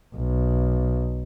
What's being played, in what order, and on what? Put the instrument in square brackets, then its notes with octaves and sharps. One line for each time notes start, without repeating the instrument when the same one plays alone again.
[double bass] B1